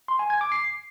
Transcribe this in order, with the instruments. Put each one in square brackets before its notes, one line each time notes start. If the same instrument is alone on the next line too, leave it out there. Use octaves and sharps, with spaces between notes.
[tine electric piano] C6
G#5
G#6
D6
C7